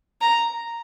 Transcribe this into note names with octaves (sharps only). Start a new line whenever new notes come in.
A#5